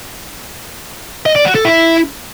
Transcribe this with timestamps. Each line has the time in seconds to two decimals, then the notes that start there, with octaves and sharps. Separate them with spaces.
1.26 D#5
1.35 D5
1.45 F#4
1.55 A4
1.65 E4